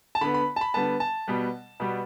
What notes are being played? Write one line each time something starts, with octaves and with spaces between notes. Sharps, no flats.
A5
D3 B3 B5
B5
A5
B5
D3 G3 B3 A5
A5
B2 G3 B3
B2 G3 B3